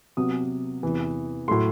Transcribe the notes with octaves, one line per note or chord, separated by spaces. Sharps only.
C3 F#3 B3 D#6
E2 C3 E3
A2 F#3 A3 C6